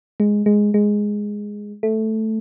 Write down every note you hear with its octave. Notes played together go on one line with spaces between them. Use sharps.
G#3
G#3
G#3
A3